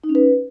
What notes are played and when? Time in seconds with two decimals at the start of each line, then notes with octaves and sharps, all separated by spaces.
0.04 D#4
0.09 C#4
0.15 B4